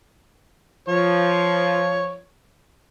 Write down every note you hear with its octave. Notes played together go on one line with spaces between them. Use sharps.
F3 C#5